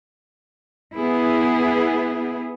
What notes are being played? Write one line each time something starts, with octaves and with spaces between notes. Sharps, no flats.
B3 E4 G#4